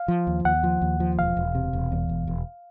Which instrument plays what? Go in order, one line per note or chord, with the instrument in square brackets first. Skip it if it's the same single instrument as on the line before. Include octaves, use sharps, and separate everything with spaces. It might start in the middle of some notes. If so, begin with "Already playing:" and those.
Already playing: [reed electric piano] F5
[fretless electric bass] F3
D#2
[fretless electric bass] D#2 [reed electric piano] F#5
[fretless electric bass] F3
D#2
F3
[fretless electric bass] E1 [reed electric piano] F5
[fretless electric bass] E1
C3
E1
E2
E1
E1